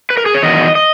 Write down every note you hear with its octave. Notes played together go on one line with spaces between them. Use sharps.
B4
A#4
G#4
C#5
E2 D#3 F#3 D#5
D#5